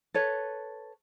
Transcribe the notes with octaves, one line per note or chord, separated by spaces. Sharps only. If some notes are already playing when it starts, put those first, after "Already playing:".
A4 B4 C#5